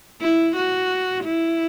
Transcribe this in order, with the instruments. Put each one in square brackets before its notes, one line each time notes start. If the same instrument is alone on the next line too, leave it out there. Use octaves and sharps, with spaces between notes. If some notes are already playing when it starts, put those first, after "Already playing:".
[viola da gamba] E4
F#4
E4